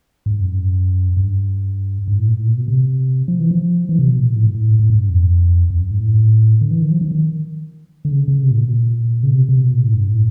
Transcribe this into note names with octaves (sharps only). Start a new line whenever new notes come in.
G#2
F#2
G2
G#2
A2
A#2
A2
A#2
B2
C3
F3
E3
F3
E3
C3
B2
A#2
A2
G#2
A2
A2
G#2
G2
F2
F2
F#2
G#2
A2
D3
E3
D#3
F3
D#3
D#3
D3
C#3
C#3
C3
A2
A#2
B2
A#2
C#3
C3
C3
B2
A#2
A2
G2
A2